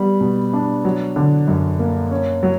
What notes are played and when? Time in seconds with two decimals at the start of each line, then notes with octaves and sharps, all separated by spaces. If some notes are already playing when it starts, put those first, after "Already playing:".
Already playing: G3 B3
0.21 B2
0.53 D4
0.85 F#3
1.16 D3
1.48 F#2
1.79 A#3
2.11 C#4
2.43 F#3